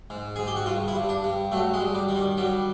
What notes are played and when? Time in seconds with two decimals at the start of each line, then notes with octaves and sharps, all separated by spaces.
0.10 G#2
0.36 G#2 G#4
0.47 G4
0.56 F#4
0.66 G2 F4
0.88 E4
0.96 G2
1.09 D4
1.24 G2
1.52 F#3 A3
1.74 G#3
1.80 G2
1.94 G3
2.09 D#3
2.15 G3
2.37 F#3 G3